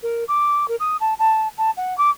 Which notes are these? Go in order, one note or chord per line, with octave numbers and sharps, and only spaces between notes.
A#4
D6
A#4
D#6
A5
A5
A5
F#5
D6